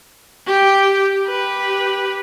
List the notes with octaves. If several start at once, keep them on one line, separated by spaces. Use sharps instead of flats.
G4 G5
G4 B4